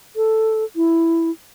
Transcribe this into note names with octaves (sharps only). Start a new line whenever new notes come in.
A4
E4